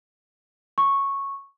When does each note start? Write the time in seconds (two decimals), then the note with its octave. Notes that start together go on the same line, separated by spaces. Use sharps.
0.78 C#6